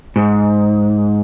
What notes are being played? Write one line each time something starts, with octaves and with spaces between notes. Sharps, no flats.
G#2